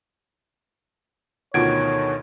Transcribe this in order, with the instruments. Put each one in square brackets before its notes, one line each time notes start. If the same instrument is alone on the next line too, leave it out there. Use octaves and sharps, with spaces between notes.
[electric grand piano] D2 B2 D#3 [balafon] F4 F#5 [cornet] C#5 [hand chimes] G#6 D7